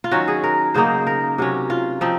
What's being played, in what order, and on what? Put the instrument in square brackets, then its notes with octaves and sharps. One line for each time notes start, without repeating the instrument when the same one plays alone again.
[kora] F4
D#3 F#3 C#4 F#4
G#4
A#4
C#3 F#3 A#3 D#4 C5
A#4
C3 F#3 C#4
F4
F3 C4 D#4